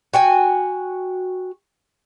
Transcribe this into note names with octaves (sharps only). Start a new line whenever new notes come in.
F#4 G5 G#5